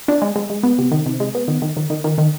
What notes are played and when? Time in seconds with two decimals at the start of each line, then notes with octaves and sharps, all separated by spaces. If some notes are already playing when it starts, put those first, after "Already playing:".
0.08 D4
0.22 G#3
0.36 G#3
0.50 G#3
0.63 B3
0.78 C3
0.91 D#3
1.06 C3
1.20 G#3
1.35 B3
1.48 D#3
1.62 D#3
1.77 D#3
1.90 D#3
2.04 D#3
2.18 D#3